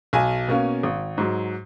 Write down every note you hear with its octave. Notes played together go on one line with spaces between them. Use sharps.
B1 G#5
B2 A#3 C#4
G#1
G#2 F#3